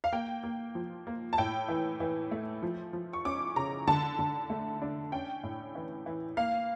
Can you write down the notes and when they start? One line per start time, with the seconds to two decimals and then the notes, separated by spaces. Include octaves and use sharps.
0.04 F5
0.12 A#3 G5
0.43 A#3
0.75 F3
1.07 A#3
1.33 A5
1.38 A2 G5
1.68 E3
2.00 E3
2.31 A3
2.63 F3
2.93 F3
3.13 C#6
3.25 C#4 D6
3.56 C#3 A#5
3.87 D3 A5
4.19 D3
4.50 A3
4.82 D4
5.12 C#4 G5
5.43 A2
5.75 E3
6.06 E3
6.37 A#3 F5